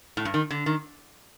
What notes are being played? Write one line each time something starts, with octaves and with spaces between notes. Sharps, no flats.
A2
G2
D#3
D3
D#3